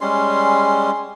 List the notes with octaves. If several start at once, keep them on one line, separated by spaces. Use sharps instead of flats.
G3 G#3 C#4 C6